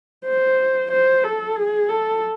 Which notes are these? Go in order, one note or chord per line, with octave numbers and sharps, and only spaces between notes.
C5
C5
A4
G#4
A4